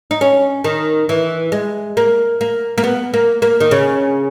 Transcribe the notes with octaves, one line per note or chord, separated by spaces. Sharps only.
D#4
C#4
D#3
E3
G#3
A#3
A#3
A#3
B3
A#3
A#3
D#3
C#3